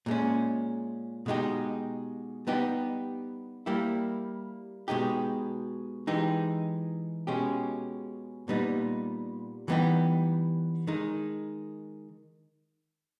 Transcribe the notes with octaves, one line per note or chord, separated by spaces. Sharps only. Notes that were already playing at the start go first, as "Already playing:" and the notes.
A#2 G#3 C#4
B2 G#3 D#4 G4
G3 B3 D#4 G4
G3 A#3 E4 G4
B2 G#3 D#4 G4
E3 G#3 D#4 G4
B2 G#3 C#4 G4
A#2 G3 B3 D#4
E3 G3 B3 D#4 G4
D#3 G#3 D#4